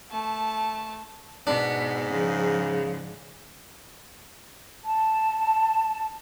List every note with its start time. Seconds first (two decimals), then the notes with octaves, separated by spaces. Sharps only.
0.10 A3 A5
1.47 G#2 B2 B3 D4
2.12 C#3 F3
4.82 A5